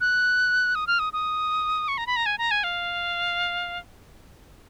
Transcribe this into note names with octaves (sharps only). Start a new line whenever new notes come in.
F#6
D#6
F6
D#6
D#6
C#6
A#5
B5
A#5
G#5
A#5
G#5
F5